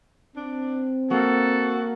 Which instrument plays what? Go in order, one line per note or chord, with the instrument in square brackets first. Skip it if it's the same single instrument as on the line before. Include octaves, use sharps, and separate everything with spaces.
[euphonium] C4 [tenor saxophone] D4
[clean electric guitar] A#3 [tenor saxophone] F#4 [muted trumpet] A4